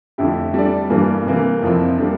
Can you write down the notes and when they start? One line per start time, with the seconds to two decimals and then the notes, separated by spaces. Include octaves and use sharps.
0.18 F2 D3 A3 E4 G4
0.54 G3 D4 A4 D5
0.90 G2 E3 G3 A#3 D4
1.26 C3 E3 A#3
1.62 F2 C3 F3 C4 E4
1.98 G3 A#3 D4